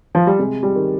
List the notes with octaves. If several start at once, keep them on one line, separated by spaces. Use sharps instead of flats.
F3
G3
C3 G#3
G3
D#3